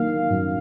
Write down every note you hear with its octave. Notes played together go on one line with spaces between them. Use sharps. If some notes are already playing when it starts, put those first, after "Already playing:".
Already playing: D#3 A#3 F5
F#2